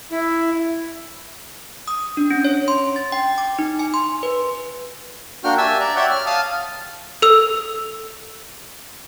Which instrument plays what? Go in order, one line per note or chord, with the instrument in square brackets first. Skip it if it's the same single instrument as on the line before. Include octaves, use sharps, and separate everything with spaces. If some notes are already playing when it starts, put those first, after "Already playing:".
[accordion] E4
[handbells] D#6
D4
C#4
C#5
C6
A6
G5
D6
D#4
G#5
C6
B4
[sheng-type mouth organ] A#3 D4 F#4 G5 F6
G4 E5 G#5 A5 E6
D5 A#5
C#5 D5 E5 F#5 G5
F6
F5 A5 D#6 F6
[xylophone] A4 E6